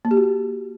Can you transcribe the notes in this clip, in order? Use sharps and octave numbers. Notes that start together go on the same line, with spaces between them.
A#3
G4
F#4
G4